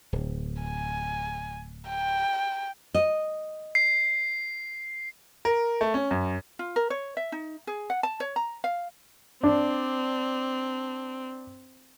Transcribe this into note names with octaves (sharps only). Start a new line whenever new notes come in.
D1
G#5
G5
D#5
C7
A#4
A3
C#4
F#2
F4
A#4
C#5
E5
D#4
G#4
F#5
A5
C#5
A#5
F5
C4 D4